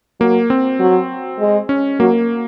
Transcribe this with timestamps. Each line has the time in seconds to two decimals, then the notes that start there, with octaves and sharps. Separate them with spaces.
0.20 F#3 A#3
0.50 C4
0.80 F#3
1.39 G#3
1.69 C#4
2.00 F#3 A#3